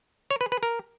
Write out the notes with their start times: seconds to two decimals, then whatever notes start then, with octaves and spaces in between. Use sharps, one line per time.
0.31 C#5
0.41 B4
0.52 B4
0.63 A#4